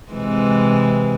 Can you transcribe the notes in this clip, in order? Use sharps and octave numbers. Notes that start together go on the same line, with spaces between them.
C3 E3 G#3